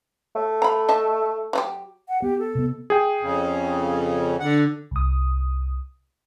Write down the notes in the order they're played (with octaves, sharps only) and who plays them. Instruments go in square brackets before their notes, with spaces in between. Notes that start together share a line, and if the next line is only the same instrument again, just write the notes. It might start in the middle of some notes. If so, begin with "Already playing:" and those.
[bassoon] A3
[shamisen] A#5 B5
D#5 E5 A5
F#3 F4 G4
[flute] F#5
[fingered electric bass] B3 [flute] G4
[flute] A4
[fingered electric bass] C3 B3
[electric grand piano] G#4 G5
[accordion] F2 C#3
[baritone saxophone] D3 [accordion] F#5
[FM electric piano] C2 D#6